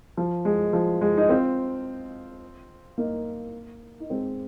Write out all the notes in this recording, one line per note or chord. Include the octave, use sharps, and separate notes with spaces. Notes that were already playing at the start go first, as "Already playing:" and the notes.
F3
G#3
F3
G#3
D#4
C4 F4
A#3 D#4
D#4
G#3 C4